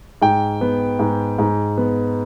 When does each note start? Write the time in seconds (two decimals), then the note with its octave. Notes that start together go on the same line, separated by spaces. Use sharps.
0.22 G#2 G5
0.61 B3
0.99 G#2
1.39 G#2
1.78 B3